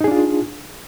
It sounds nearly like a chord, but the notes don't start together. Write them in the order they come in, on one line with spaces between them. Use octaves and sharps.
D#4 G#4 D4 F4